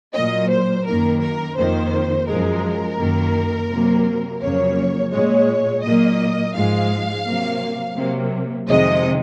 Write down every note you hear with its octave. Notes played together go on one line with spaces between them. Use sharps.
A#2 F#3 A#3 D#5
C5
F#2 D#3 A#3 A#4
A#4
F2 D#3 A#3 C5
F#2 F3 G#3 A#4
F#2 D#3 A#3
C3 F#3 A#3
F2 C#3 F#3 A#3 C#5
A#2 G#3 C#5
A#2 F#3 A#3 D#5
G#2 F3 G#3 F5
C3 F#3 A#3
C3 F#3 A#3
F2 C3 D#3 G#3 D#5